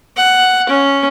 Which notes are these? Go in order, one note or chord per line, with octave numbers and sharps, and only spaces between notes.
F#5
C#4